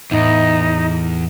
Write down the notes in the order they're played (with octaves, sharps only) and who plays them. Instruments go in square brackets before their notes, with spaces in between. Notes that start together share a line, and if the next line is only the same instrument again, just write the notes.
[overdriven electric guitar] E2 [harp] A2 [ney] D#4